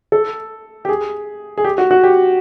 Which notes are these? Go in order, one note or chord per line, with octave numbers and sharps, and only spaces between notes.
A4
G4
G#4
G#4
G4
F#4
F#4
G4